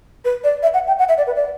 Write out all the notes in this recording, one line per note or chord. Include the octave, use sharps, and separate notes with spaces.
B4
D5
E5
F#5
G5
F#5
E5
D5
B4
D5